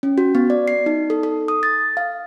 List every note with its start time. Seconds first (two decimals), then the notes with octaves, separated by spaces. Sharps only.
0.03 C#4
0.18 F#4
0.35 B3
0.50 D5
0.68 C7
0.86 D#4
1.10 A4
1.23 A4
1.48 D#6
1.63 A6
1.97 F5